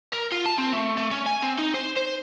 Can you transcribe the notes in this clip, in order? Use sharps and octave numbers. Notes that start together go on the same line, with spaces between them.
A#4
F4
A5
C4
A3
A3
C#4
G#5
C4
D#4
C5
C5